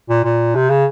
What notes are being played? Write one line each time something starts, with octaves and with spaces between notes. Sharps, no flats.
A#2
A#2
C3
C#3